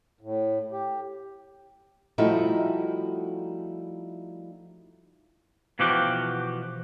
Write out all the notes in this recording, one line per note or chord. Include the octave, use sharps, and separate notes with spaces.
A2
G4
F3 G3 A3 D#4 E4 F#4
B2 E3 F3 F#4 G4